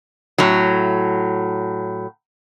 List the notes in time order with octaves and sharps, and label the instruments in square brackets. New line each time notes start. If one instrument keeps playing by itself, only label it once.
[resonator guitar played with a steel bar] A2 F#3